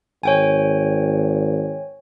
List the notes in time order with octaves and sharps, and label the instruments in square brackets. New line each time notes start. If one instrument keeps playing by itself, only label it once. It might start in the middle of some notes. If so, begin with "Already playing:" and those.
[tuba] G#1 [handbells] C#5 G5 G#5